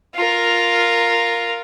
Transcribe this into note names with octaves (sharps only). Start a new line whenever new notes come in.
F4 A#4